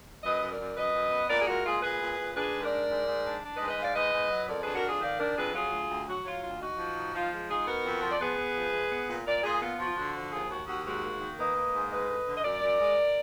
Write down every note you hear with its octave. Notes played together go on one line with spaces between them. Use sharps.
F#2 B4 D#5
F#2
A#4 D5
F#2
F#2 B4 D#5
F#2
B3
A#2 A#4 D5
G#4
G#3 F#4 A#4
A#2 F4 G#4
A#2 G#4 B4
A#2
A#2
D4 G#4 B4
G#2
A#4 D5
D4
G#2
G#2
D4
D4
G#2 B4 D#5
B4 D#5
G#2 D5 F5
G#2 B4 D#5
G#2
F#3
F2 A#4 D5
D4 G#4 B4
F#4 A#4
F2 F4 G#4
D#3 D5 F5
D4 A#4 D5
F2 G#4 B4
F#3 F4 G#4
D2
D2
F#3 F#4
F#3 F4
D2 F4
D#4 F#4
F3
D#4
F3 F4
G#3
D#4 F4 G#4
B3 F#4 A#4
F2
F3
D5
B3 G#4 B4
B3
F3
G#3
B3
A#2
A#2 A#4 D5
A#2 F4 G#4
B3 F4
F3 F#4
F4
D3 F#4
F3
D#2 F4 G#4
D#2 F#4
D#2 F#4
G#2 F#4
A#3
D#3
A#3 B4 D#5
A#3
G#2
G#3 B4 D#5
D3
D3
D#5
F#2 A#4 D5
F#2
G#3